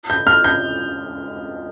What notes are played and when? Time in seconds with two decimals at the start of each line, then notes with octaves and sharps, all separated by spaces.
0.10 G6
0.27 F6
0.44 G6